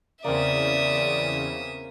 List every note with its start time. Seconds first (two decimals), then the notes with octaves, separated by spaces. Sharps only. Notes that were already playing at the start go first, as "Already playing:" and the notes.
0.24 E2 C#3 A#3 C4 D5 E5 D#6